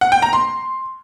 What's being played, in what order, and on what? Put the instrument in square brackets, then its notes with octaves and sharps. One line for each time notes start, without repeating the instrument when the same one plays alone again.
[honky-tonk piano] F#5
G5
A#5
C6